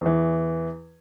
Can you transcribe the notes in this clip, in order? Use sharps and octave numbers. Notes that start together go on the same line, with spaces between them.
E2 E3